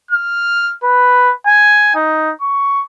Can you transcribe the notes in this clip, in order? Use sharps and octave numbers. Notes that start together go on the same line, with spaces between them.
F6
B4
G#5
D#4
C#6